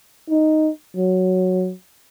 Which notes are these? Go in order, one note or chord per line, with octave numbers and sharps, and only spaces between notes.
D#4
F#3